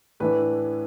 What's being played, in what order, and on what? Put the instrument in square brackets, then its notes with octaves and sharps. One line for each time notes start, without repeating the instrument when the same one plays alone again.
[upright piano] A2 E3 A3 D4 B4